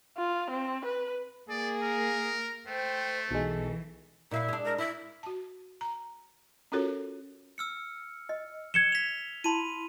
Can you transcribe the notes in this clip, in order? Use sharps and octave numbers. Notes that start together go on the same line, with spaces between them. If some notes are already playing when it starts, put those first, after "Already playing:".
F4
C4
B4
A#3 G#4 D5
A#4
A3 C5 G5
B1 E3 G#3 A4
A#2 E4 E5 F5
G#3 D4
A#4
E4 E5
F#4 A5
A#5
C#4 F4 F#4 A4 A#4 C#5
E6 F6 C#7
D#5
G#6 C#7 E7 G7
B6 F7
E4 A5 B5 C6 D#7